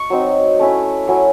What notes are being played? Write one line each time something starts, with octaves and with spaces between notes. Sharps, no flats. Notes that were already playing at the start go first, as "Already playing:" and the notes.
Already playing: C#6
F#3 C4 D#4
A3 C#4 E4
F#3 C#4 E4 C#6